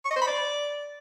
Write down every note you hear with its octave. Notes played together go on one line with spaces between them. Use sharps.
C#6
D#5
C5
B5
D5